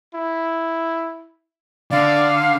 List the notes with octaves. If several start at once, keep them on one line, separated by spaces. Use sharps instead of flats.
E4
D3 D5 F5